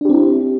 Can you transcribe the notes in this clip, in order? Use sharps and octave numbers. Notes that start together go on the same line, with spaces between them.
C4 D4 E4 G4